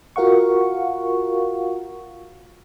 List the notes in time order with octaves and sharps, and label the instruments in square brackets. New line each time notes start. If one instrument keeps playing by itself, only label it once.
[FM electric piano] F4 F#4 A#4 F5 F#5 C#6